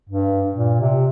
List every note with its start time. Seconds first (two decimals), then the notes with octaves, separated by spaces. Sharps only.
0.09 G2
0.53 A#2
0.81 C3